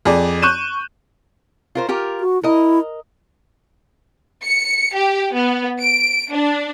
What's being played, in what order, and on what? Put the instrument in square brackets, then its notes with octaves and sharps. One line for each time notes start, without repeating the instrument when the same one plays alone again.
[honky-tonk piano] F2 G#4 D5
C#6 F#6 G6 D#7 E7
[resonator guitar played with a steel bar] F4 A#4 C5
F4 G4 A#4
[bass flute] F#4
[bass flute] E4 [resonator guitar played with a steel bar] A#4 D#5
[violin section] C#7
G4
B3
D7
D4